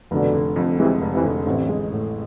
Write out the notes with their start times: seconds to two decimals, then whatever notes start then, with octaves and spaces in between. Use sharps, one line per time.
0.11 F1 B2 D3
0.34 D3
0.56 F2
0.78 C3 E3 G#3
1.01 F1
1.12 C3 E3
1.24 D3
1.46 A1 A2 C3
1.69 G#3
1.92 A2